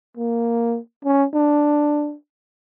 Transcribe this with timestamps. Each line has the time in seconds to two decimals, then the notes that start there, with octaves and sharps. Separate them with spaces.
0.17 A#3
1.05 C#4
1.34 D4